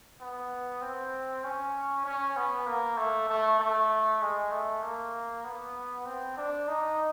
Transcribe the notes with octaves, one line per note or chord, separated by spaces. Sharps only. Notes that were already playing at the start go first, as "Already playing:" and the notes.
B3
C4
C#4
C#4
B3
A#3
A3
A3
A3
G#3
A3
A#3
B3
C4
D4
D#4